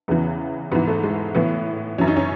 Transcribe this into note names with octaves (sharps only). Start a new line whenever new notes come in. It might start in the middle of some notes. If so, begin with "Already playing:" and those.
E2 C#3 E3 B3
G#2 E3 B3
A3
G#3
A2 E3 B3
F#2 E3 C#4
D#4
C#4